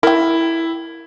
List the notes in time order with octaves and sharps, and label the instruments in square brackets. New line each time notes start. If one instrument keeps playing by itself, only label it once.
[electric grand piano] E4 [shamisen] A#4 G5